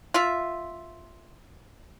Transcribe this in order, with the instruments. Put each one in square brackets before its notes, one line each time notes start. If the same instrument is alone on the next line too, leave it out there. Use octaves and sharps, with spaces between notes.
[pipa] F4 E5